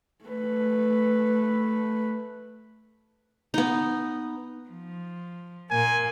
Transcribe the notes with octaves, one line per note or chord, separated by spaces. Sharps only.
A3 B4
B3 D#4
F3
A#2 A#3 G#5